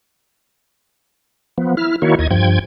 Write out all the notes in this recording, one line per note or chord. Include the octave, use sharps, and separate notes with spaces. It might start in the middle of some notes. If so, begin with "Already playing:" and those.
F3 B3
E4 F6
D#3 A#3 E4 F#4 C#5
D#2 D#5 G#6
G2 F3 G5 G#6